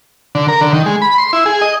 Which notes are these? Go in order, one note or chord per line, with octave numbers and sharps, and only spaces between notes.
D3
A#4
D3
D#3
G#3
B5
C6
E4
G#4
D#5